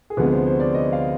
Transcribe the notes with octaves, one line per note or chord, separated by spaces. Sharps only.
G#4
D2 C3 F3 G#3 B3 B4
C5
C5
D5
D#5
F5